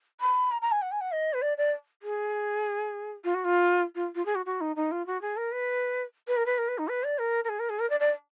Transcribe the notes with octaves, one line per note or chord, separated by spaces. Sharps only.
B5
A#5
A#5
G#5
F#5
G#5
F#5
D#5
B4
D5
D5
G#4
F4
F#4
F4
F4
F4
G#4
F#4
F#4
D#4
D#4
F4
F#4
G#4
A#4
B4
B4
A#4
B4
A#4
B4
D#4
B4
D5
A#4
A#4
G#4
A#4
G#4
A#4
D5
D5